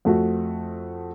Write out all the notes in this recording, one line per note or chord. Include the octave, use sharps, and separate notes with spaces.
F2 A3 F#4